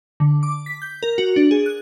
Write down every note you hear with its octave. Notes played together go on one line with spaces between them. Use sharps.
D3
D6
B6
G6
A#4
F#4
D4
G#4
F#6